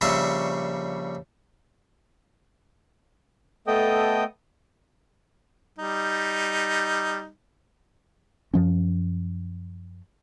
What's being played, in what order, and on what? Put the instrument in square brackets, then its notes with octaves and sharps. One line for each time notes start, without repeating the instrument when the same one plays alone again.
[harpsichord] A#1 C#3 G3 E5 C6 C#6
[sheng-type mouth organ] A3 B3 A4 D#5 G5 D#6
[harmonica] G3 D#4
[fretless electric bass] F#2 F3 C#4